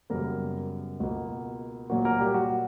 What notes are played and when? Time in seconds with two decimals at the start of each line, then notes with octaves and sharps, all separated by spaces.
0.10 F#2 C#3 G3 A#3 B3 A#4
1.00 C#2 B2 A#3 F#4
1.90 A#2 F#3 A#3 F#4
2.05 A#3 A#4
2.20 G3 G4
2.34 F#4